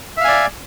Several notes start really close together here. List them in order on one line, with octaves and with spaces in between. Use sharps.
E5 F5 G#5 D5